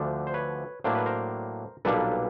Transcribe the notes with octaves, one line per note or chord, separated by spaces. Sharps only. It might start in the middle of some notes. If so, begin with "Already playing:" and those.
Already playing: D2 D3 F3 A3 D4
C5
B4 C#5
A2 F#3 A#3 D4 C5
B4
A#4 C5
B1 A#2 G3 A#3 D4 A4 B4